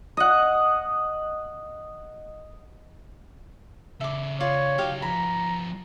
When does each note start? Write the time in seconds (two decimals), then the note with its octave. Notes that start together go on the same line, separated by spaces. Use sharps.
0.17 D#5 F#5
4.01 C#3 A4 E5 D6
4.40 F4 C#5 D5
4.78 F#3 D#4 G4 F5
5.02 F3 B3 A#5 B5